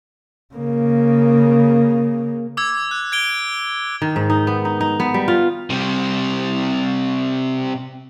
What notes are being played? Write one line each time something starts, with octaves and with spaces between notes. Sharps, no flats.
C#3 A#3
D6 E6 G#6
F#6
G#6 D7 G7
D#3
G#2
D#4
B3
D#4
D#4
B3
G3
F4
C3 G3